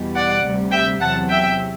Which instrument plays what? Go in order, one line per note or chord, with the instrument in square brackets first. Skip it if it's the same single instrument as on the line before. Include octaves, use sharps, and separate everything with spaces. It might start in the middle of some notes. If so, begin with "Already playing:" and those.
Already playing: [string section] E2 B2 G3
D5 F#5
D2 C3 G3
E5 G5
E2 C3 F#3 F#5 A5
E5 G5